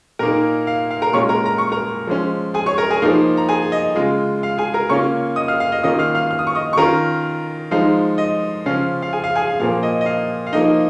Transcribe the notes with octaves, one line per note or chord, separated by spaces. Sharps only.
A#2 A#3 D#4 A#4 A#5
F5
F5
A#4 A#5
A#2 G#3 C#4 F4 C#5 C#6
A#4 A#5
A#5
C#6
A#4 A#5
F3 G#3 C#4
G#4 G#5
C#5 C#6
A#4 A#5
G#4 G#5
F3 A#3 D#4 F5
A#5
G#4 G#5
D#5
C#3 G#3 F4
F5
G#4 G#5
A#4 A#5
C#3 A#3 C#4 F4 C#5 C#6
D#5 D#6
F5 F6
F5
D#5
D#3 A#3 C#4 F4 D#5 D#6
F5 F6
F5 F6
F6
D#6
C#6
D#5 D#6
C#6
D#3 C#4 F4 A#4 A#5
F3 G#3 D#4 F5
D#5
C#3 F3 C#4 F4 F5
F5
G#4 G#5
F5
G#4 G#5
F5
A#2 F3 A#3 F5
D#5
D#5
F5
F5
F3 A#3 D#4 D#5